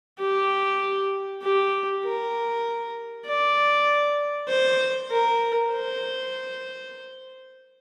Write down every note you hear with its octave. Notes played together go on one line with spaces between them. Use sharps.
G4
G4
A#4
D5
C5
A#4
C5